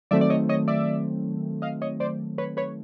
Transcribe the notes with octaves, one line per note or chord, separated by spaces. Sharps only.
D#3 F#3 A3 C4 D5 E5
D5
C#5 D#5
C#5 D#5
D5 E5
D#5 F5
C#5 D#5
C5 D5
B4 C#5
B4 C#5